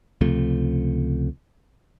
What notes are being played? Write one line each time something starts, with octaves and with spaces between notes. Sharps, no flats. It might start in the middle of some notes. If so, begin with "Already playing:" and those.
C#2 C3 F3 A3